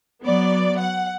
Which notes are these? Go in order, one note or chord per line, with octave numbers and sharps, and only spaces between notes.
F#3 B3 D5
F#5